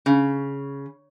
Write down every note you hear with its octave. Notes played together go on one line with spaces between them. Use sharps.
C#3